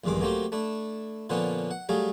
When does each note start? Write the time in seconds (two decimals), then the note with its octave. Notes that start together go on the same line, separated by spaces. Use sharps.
0.04 A#1 E2 G2 D#3 G#3 D6
0.21 F#3 A3 A#3 C4 G4
0.52 A3 D4 E4
1.30 A#2 D3 F3 B3 C#4 D4
1.71 F#5
1.89 F#3 G3 A3 G#4 F5